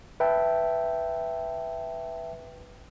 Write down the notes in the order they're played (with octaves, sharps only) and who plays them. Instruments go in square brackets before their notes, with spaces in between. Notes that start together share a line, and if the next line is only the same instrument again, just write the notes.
[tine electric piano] B4 E5 G5 A5